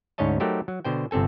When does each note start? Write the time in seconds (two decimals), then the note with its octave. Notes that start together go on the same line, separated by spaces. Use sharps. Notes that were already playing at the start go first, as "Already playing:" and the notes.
0.18 D2 G#2 C#4 C#5 D#5 A5
0.40 F#3 A3 D#4 G4 A#4 C5
0.68 F#3
0.85 B2 D3 C5 G5
1.11 G1 C3 C4 A4 G#5